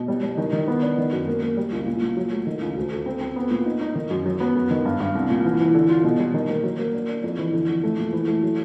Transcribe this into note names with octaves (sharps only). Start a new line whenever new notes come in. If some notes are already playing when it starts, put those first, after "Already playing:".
Already playing: B2
G3
G3
D#3
D#3
B3
D4
D#3
F#2
A#3
A#3
G3
C#2
A#2
A#2
F#3
A3
D#3
C#2
D2
D2
C4
C4
B3
A#2
D#4
D#4
D#3
F#2
F#3
B3
F#2
D#3
G2
G2
C2
A#2
E3
E3
D3
F4
B2
G3
D#3
A#3
F#3
A#3
D4
D4
F2
E3
D3
F2
A3
A#2
E3
A3
F#3